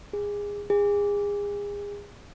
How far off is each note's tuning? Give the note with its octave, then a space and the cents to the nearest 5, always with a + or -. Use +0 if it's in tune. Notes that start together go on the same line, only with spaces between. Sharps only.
G#4 -20
G#4 -30